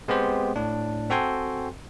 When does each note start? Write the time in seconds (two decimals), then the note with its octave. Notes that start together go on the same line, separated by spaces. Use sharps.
0.08 G#3 B3 C4 G4 C5
0.56 A2 D4
1.10 C4 F#4 A4 G5 G#5 C6